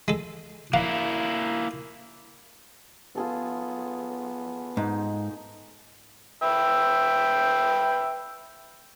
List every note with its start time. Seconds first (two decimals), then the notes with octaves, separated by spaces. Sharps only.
0.08 G#3 A4
0.73 A#3 E4 F5 F#5
3.15 B3 F4 G#4 A4
4.77 G#2 D#4
6.42 B4 E5 G5